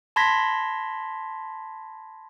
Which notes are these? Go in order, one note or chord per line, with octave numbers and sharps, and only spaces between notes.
A5 B5 C6 G#6 A#6 B6